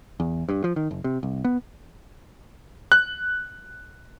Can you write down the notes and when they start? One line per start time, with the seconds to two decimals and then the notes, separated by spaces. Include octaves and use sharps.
0.20 E2
0.49 G2
0.64 F3
0.76 D#3
0.91 F#1
1.04 C3
1.23 C2
1.45 B3
2.92 F#6